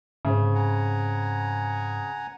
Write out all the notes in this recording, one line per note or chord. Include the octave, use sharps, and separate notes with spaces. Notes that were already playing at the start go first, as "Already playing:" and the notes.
G#2 C#3 C4
F#5 G#5 A#5